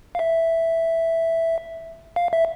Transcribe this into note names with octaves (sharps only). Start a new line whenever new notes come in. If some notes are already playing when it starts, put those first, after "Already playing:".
F5
E5
F5
E5